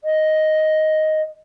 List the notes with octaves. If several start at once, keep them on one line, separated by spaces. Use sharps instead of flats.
D#5